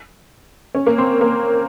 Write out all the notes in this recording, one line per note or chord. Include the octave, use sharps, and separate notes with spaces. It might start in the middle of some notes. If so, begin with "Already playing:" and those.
C#4
A#3
C4
A#3